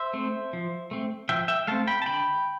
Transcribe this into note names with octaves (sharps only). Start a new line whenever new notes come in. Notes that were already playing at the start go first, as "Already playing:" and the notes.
Already playing: C5 E5
A3 C4
F3
A3 C4
F3 E5 G5
E5 G5
A3 C4 F5 A5
G5 B5
A5
D3 G5 B5